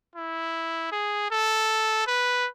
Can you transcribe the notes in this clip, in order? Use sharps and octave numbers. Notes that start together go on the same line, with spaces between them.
E4
G#4
A4
B4